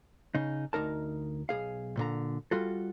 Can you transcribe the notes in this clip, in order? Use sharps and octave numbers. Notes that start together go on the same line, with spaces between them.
C#3 D#4
D2 D#4 A#4 A5
B1 G#4 F5
A#2 D3 A#5
G3 F4 F#4 A4